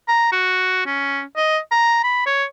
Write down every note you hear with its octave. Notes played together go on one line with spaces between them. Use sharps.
A#5
F#4
C#4
D#5
A#5
B5
C#5